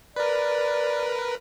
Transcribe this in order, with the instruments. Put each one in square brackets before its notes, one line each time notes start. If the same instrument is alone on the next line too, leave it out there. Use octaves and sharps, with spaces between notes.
[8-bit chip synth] A#4 B4 [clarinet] D5